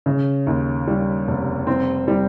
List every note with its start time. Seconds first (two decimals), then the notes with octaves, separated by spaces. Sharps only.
0.06 C#3
0.47 D#2
0.88 G3
1.28 F1
1.67 C4
2.08 G3